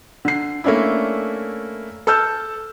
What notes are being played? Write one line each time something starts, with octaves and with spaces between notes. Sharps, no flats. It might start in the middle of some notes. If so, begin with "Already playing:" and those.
D3 C7
A3 A#3 C#4 D4 E4
A4 A5 E6 F6 G6